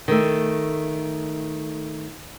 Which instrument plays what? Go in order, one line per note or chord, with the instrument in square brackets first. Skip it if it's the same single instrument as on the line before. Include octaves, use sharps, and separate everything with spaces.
[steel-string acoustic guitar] D#3 A3